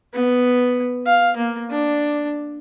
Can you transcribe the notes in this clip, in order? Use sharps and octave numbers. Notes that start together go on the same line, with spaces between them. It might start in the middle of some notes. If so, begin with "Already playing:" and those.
B3
F5
A#3
D4